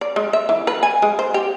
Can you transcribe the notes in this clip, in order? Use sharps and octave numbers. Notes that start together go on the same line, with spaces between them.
D5
G#3
E5
E3
B4
G#5
G#3
C5
G4